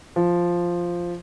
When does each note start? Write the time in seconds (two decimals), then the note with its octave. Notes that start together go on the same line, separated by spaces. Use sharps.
0.16 F3